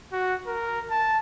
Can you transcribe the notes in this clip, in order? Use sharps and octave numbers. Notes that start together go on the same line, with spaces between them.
F#4
A#4
A5